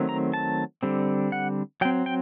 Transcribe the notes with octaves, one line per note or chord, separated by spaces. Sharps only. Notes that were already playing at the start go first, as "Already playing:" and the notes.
Already playing: D#3 F#3 A3 C4
A#5
A5
D3 G3 C4
F#5
F#3 C4 G5
G5